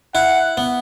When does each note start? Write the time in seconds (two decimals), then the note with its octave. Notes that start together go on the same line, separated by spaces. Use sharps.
0.15 E4 F#5
0.57 B3